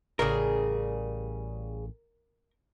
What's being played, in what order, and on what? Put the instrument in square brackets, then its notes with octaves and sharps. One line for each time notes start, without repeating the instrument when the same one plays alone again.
[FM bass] A1 [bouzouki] C#3 G3 G#4 [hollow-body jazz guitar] A#4